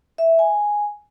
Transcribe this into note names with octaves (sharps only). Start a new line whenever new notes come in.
E5
G#5